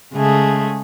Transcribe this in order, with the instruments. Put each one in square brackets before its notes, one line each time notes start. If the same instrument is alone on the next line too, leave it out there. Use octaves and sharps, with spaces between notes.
[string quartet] C#3 G#3 A3 G#4